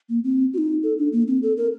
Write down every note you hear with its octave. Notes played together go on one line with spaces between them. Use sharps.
A#3
C4
F#4
D#4
A4
D4
A#3
C4
A4
A#4